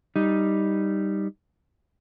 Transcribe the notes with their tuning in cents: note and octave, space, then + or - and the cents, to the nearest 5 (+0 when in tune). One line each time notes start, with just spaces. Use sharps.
G3 +0 D#4 +0